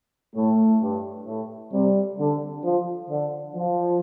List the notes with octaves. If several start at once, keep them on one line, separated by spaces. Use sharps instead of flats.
A2 A3
G2
A2
C3 G3
D3
F3
D3
F3